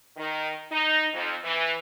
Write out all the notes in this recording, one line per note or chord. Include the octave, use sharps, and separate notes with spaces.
D#3
D#4
F2
E3